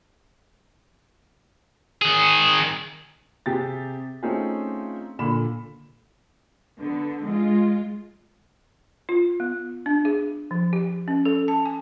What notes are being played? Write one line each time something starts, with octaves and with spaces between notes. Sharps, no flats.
D#3 G#4
C3 G4 G#4 A6
A3 C4 C#4 D#4 F4 G#4
A#2 D3 B5 E7
D3 B3
G#3 F4
F4
B3
D4
G#4
F3
G4
C#4
A4
A5
G#5